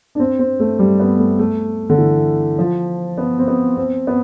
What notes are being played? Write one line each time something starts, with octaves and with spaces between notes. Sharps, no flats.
D4
C4
C4
A3
G3
B3
A3
A3
D3
E3
F3
B3
C4
B3
C4
B3